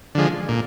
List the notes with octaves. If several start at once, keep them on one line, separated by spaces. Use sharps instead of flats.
D3 F3 G#3
A#2